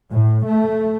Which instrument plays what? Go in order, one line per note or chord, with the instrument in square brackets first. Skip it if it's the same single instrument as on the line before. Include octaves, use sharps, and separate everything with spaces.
[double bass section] A2
A3